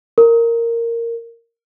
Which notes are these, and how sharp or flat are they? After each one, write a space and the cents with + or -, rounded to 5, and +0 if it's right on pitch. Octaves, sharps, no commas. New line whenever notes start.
A#4 -10